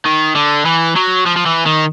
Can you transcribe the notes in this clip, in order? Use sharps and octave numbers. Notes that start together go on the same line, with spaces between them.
D#3
D3
E3
F#3
F3
F3
E3
D#3